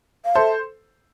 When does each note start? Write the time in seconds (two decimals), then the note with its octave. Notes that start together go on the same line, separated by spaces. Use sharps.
0.25 F5
0.35 A4 C5 E5